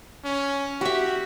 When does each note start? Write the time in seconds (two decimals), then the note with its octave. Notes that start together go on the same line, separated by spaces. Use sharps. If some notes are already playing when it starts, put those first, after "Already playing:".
0.24 C#4
0.81 F#4 G4 E5